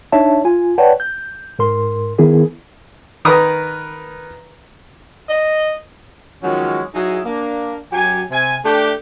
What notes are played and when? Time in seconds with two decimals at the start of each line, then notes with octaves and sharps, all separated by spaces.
0.12 D4 D#4 C#5 E5 A5
0.45 F4 G#5
0.78 B4 C#5 D5 F#5 G5 A5
1.00 G6
1.59 G#2 A#4 C6
2.18 D#3 B3 E4 G#4 A#4
3.25 D#3 A#4 B4 D#6
5.29 D#5
6.43 D#3 F3 F#3 G#3 C#4
6.94 F#3 D#4 E4 G#4
7.25 A#3 D4
7.92 F#2 F#3 G4 G#5
8.31 C3 G#5
8.65 A3 D4 G4